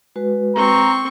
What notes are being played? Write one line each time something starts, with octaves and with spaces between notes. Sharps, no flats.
G#3 F#4 B4
C4 A#5 C#6